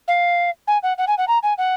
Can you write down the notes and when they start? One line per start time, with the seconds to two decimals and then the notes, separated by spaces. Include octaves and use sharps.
0.08 F5
0.67 G#5
0.83 F#5
0.98 F#5
1.07 G#5
1.18 F#5
1.28 A#5
1.43 G#5
1.58 F#5